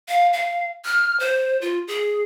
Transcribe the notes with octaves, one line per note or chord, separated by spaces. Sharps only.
F5
F5
F6
C5
F4
G#4